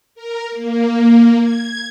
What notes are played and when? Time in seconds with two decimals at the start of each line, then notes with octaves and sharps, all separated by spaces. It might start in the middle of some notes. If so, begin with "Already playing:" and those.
0.15 A#4
0.51 A#3
1.40 G#6